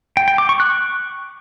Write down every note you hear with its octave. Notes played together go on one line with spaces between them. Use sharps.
G5
G5
D6
C#6
F#6